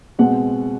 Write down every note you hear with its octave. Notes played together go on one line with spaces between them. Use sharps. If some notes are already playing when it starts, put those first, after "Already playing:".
B2 G#3 C4 F#5